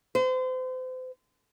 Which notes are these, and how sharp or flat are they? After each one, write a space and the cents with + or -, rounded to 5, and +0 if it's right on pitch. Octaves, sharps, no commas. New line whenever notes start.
C5 -35